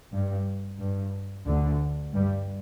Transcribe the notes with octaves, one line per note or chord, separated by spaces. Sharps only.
G2
G2
D2 D3
G2 G3